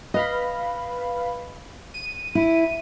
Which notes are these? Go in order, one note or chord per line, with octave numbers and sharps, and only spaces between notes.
B4 D#5 F5 B5
D#7
E4